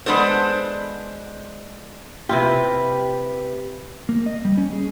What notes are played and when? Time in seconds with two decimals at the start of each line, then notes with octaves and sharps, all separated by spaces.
0.06 G#3 B3 D4 A4 C5
2.29 C3 E4 F4 G4 B4
4.09 A#3
4.26 D#5
4.45 G3
4.58 C#4
4.73 G#4